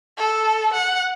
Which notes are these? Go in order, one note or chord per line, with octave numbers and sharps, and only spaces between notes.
A4
F#5